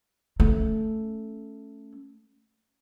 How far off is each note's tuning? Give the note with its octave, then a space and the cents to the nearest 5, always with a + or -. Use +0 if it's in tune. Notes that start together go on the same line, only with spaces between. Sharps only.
A3 +0 C#4 +0